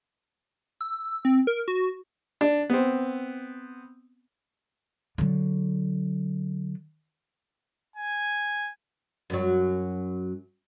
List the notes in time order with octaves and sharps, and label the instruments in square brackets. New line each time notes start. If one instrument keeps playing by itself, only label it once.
[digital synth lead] E6
C4
A#4
F#4
[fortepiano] D4
B3 C4
[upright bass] D3 F#3
[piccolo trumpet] G#5
[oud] F#2 F#3